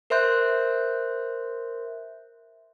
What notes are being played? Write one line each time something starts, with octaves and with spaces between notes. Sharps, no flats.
A#4 C5 E5 C6 F#6 G6